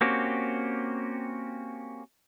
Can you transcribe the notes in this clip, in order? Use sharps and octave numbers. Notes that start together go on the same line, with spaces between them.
A#3 C4 C#4 F#4 G4